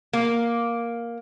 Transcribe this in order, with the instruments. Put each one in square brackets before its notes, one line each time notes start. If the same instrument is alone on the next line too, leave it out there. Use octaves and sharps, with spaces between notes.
[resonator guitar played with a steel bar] A#3